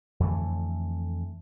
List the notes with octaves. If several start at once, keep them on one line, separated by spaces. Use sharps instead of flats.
F2 D3 E3 A3